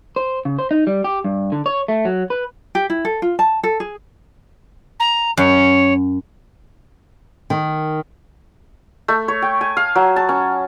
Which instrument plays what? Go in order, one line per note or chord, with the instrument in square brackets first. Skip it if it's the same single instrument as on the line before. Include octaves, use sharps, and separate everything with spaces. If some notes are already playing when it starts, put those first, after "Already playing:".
[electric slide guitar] C5
C#3
C5
D#4
G3
G4
G2
D3
C#5
A3
F#3
B4
[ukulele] G4
E4
A4
F4
A5
A4
G#4
[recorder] A#5
[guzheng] F#2 [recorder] C#5
[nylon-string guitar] D#3
[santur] A3
C#5
G5
G#5
F5
F#3
A5
C#4